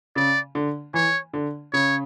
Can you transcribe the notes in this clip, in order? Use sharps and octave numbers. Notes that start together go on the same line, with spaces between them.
C#3 D5
D3
E3 C#5
D3
C#3 C#5